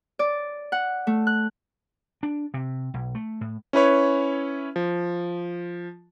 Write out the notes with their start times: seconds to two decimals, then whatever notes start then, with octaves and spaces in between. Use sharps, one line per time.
0.19 D5
0.72 F#5
1.07 A3
1.27 F#6
2.23 D4
2.54 C3
2.94 B1
3.15 A3
3.41 A2
3.73 C#4 E4 B4 C#5
4.76 F3